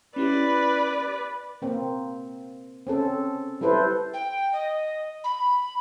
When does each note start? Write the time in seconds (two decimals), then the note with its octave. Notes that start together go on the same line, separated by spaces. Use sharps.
0.16 C#4 E4 G4 B4 D5
1.62 A#3 C4
2.87 C4 C#4 A4
3.61 G3 E4 A4 B4 C5
4.13 G5
4.53 D#5
5.24 B5